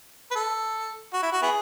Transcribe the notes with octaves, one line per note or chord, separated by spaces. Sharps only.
B4
A4
F#4
E4
F#4
B3 E4 G#4